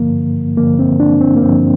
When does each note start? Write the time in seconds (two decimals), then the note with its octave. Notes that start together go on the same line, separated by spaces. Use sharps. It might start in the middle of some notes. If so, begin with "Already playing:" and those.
Already playing: G2 D3 F3 A#3
0.57 G2 D3 F3 A#3
0.79 C4
1.00 D4
1.21 C4
1.36 A#3
1.43 G2 D3 F3 C4